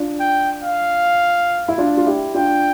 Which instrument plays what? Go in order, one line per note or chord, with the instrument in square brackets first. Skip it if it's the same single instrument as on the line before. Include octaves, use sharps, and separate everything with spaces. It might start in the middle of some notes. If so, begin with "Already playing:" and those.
Already playing: [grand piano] D4 F4
[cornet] G5
F5
[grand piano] E4
D4 F4
F4
E4 G4
[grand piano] D4 F4 [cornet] G5